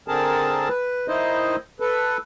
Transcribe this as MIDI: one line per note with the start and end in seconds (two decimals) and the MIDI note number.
0.08 0.68 50
0.08 0.68 60
0.08 0.68 68
0.08 0.68 70
0.08 0.68 81
0.68 1.07 71
1.08 1.56 51
1.08 1.56 63
1.08 1.56 64
1.08 1.56 72
1.08 1.56 75
1.80 2.18 69
1.80 2.18 71